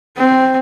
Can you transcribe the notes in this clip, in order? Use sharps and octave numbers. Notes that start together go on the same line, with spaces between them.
C4